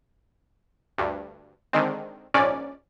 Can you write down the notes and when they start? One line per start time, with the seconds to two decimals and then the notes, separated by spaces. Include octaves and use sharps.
0.98 D2 G2
1.73 D3 D#3 G#3 C4
2.34 A#1 G#2 C#4 D5